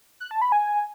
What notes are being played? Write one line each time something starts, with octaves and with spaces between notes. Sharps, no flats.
F#6
A5
B5
G#5